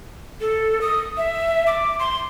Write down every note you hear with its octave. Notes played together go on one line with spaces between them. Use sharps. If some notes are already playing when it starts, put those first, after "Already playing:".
A4
D#6
E5
D6
C6